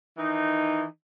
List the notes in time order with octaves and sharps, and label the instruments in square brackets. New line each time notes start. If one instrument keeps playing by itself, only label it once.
[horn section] D#3 E3 D#4